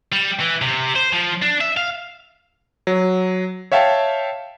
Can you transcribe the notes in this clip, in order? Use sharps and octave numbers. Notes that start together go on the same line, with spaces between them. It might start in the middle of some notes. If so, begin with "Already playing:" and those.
G3
E3
C3
C5
F3
D4
E5
F5
F#3
C#5 E5 F5 G5 A5